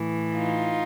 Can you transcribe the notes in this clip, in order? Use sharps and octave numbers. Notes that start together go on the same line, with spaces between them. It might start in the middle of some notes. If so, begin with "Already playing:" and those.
Already playing: A2 E3
D#4 F4